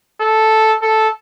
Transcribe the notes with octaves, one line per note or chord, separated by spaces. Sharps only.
A4
A4